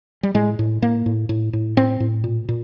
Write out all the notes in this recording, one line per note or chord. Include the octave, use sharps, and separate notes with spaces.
G3
A2 G#3
A2
A2 A#3
A2
A2
A2
A2 C4
A2
A#2
A#2